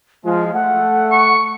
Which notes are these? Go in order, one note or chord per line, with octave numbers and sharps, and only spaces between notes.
F3 G#3 F4
A3 F#5
C#6